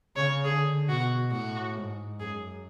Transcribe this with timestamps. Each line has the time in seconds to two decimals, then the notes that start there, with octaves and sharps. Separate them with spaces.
0.15 C#3 C#5
0.45 D3 G#4
0.88 B2 F#4
1.32 A2 F#4
1.76 G#2
2.19 F#2 G#4